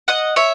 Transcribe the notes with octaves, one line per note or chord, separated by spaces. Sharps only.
D#5 F#5
C#5 E5